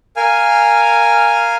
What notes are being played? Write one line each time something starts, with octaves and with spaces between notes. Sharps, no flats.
A#4 F5 G#5 F6